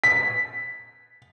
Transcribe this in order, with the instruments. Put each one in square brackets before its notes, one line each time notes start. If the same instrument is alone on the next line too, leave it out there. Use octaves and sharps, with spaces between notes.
[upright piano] B6